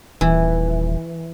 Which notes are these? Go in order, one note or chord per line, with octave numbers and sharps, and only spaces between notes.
D#1 E3